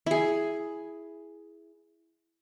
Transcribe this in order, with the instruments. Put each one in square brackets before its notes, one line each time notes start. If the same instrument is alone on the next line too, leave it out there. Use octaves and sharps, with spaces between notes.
[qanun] E4 G#4